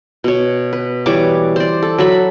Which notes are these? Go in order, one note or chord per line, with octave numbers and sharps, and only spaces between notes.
B2 C#5
B4
E3 G3 C#5 D6
C5 D5
A4
F#3 A4 E5 B5